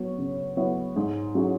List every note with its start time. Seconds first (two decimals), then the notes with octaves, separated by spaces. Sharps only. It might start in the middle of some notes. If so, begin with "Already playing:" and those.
Already playing: F#3 B3 C#5
0.18 C#3
0.57 F#3 B3 E4 C#5
0.96 G#2
1.35 F#3 C#4 E4 G#4